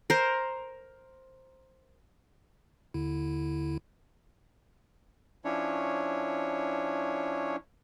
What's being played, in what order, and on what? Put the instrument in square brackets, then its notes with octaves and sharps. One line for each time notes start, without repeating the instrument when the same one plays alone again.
[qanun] A#4 C5
[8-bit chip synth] D#2 D3 E4
[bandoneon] F3 C#4 D4 E4 C#5